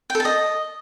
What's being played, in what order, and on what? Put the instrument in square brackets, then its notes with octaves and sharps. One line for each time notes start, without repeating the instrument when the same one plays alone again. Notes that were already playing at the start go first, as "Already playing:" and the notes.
[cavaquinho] G5
A4
A5
D#5